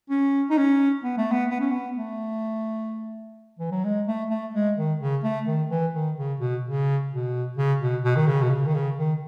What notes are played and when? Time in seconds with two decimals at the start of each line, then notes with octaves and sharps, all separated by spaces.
0.10 C#4
0.50 D#4
0.57 C#4
1.03 B3
1.18 A3
1.32 B3
1.50 B3
1.60 C#4
1.70 B3
1.96 A3
3.59 E3
3.72 F#3
3.84 G#3
4.08 A3
4.30 A3
4.54 G#3
4.77 D#3
5.00 C#3
5.23 A3
5.47 D#3
5.70 E3
5.93 D#3
6.17 C#3
6.40 B2
6.64 C#3
7.11 B2
7.57 C#3
7.81 B2
8.03 B2
8.16 D#3
8.27 C#3
8.43 B2
8.50 C#3
8.66 D#3
8.74 C#3
8.97 D#3